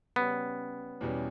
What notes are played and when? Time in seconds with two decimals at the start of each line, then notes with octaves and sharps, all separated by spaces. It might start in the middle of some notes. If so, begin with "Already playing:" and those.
0.16 C#3 G3 B3 C#4
1.01 E2 B2 G3 C#4